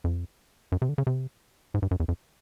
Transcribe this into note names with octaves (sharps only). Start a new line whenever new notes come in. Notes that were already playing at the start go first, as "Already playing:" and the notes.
F2
F#2
C3
D3
C#3
C3
G#2
G2
F#2
E2
F2